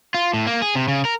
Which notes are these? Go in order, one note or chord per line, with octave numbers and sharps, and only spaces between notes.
F4
A2
A#3
G#4
C3
C#3
A#4